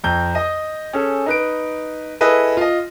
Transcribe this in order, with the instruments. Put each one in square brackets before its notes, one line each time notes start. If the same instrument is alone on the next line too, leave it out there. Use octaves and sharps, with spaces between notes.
[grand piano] F2 A#5 G6
D#5 D#6
C#4 G#4 A4
D#4 B4 D7
E4 G#4 A4 B4 D#5
F4 D#5